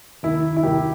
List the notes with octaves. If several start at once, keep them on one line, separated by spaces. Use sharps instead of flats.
D#2 D#3 E4
E4
D#2 D#3 G4